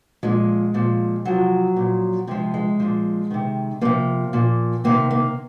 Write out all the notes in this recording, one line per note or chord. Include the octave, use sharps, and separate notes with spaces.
A#2 F3 G#3
A#2 F3
C3 F3 F#3
A#2 F3
C3 F3 G#3
G#3
A#2 F3
C3 D#3
C3 F3 A#3
A#2 F3
C3 D#3 A#3
A#3